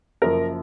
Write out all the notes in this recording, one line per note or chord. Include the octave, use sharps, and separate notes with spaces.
F#1 F#2 F3 A#4